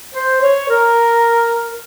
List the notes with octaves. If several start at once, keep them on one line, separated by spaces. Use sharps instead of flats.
C5
C#5
A#4